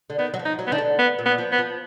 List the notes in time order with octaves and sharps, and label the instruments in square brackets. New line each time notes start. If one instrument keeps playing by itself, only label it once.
[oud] D3
[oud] D#3 [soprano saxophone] B3
[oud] F#3
F3
[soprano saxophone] D#4
[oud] F#3
[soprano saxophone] B3
[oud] D#3 [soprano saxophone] D4
[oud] D3
[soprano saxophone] B3
[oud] A#2
[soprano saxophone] B3
[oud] F3
[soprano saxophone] B3
[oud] F3